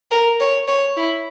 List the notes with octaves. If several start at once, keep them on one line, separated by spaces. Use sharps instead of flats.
A#4
C#5
C#5
E4